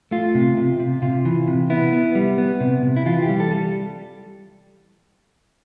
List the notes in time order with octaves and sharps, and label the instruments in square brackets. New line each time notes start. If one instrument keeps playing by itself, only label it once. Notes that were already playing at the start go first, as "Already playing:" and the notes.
[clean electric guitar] A3 F4
C3
C3
C3
C3 F4
E3
C3
B3 E4
B3
G3
B3
C3
C3
E4
E3 F4
G4
G3
A4
G3